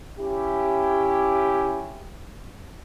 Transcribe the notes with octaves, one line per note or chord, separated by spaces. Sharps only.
C#4 E4 G4